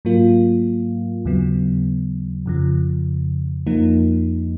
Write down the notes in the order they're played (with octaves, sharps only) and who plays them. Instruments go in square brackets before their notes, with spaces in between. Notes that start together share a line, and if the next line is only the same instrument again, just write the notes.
[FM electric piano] G#2 F#3 A#3 F4
D#2 C#3 F#3 B3
F2 C#3 F3
F2 F3 A#3 D#4